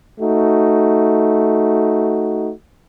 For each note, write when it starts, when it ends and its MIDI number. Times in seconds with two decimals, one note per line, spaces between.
0.20 2.50 57
0.20 2.50 63
0.20 2.50 66